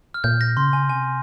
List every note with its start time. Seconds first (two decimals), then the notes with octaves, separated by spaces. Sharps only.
0.14 F6
0.24 A#2 G6
0.41 A#6
0.57 C#3 C6
0.73 G#5
0.89 C3 G#5